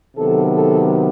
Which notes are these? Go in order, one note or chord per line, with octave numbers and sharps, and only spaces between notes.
C3 D#3 F#3 B3 A4
A4